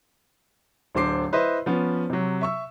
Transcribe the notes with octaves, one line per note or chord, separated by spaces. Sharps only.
D1 D3 C5 D6 C7
E4 B4 C5 D#5 E5
F3 B3 C#4
C3 F#3
E5 C#6 E6